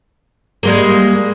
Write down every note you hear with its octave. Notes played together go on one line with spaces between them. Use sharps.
G3 G#3 A#3